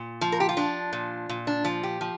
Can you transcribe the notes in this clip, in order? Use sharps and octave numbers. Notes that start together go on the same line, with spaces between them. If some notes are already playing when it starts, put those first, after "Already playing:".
Already playing: A#2
F3
A#4
G4
F4
F3 D4
A#2
A#2
D4
F3
G4
F3